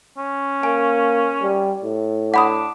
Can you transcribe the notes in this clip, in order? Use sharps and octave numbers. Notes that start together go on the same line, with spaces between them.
C#4
A#3 G#5
G3
A2
D4 F#5 B5 D#6